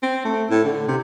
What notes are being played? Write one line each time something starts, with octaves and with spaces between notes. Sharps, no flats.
C4
A3
A2
D3
C3